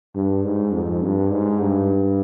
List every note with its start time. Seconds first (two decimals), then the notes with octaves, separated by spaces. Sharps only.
0.16 G2
0.44 G#2
0.73 F2
1.03 G2
1.31 G#2
1.60 G2